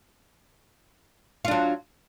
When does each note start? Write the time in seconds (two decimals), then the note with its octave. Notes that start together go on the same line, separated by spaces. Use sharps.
1.45 F4
1.48 D4
1.51 F#3